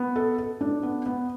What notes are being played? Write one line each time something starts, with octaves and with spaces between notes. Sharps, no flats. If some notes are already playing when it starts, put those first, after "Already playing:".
Already playing: B3
A4
A4
D4
B3
B3